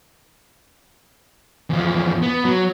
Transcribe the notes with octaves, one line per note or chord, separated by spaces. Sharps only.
E2 F3
B3
F#3